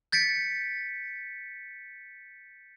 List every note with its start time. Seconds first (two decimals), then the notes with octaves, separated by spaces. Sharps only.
0.12 G6 A6 B6 C#7 D7